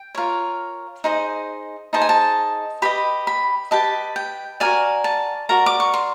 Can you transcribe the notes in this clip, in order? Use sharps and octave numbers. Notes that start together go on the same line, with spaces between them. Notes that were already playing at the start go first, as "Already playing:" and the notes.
Already playing: G5
F4 A#4 C#5
D#4 G#4 C5 D#5
D#4 G#4 C5 D#5 A5
G#5
A5
G4 B4 D#5 B5
B5
G4 B4 D#5 A5
G5
F#4 A#4 D5 G#5
A5
F#4 A#4 D5 A#5
D6
C#6
C6